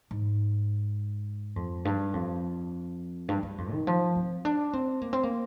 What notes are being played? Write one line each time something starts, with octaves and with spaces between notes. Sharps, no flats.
G#2
F2
G2
F2
G2
G2
F2
D#3
F3
C4
D4
C4
A#3
C4
A#3